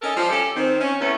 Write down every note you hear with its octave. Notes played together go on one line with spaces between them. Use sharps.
C#4 A4 A#4 D#5
F3 G3
C#4 G4 A4
D#3 C4
C#4
E2 A3 B3 C#4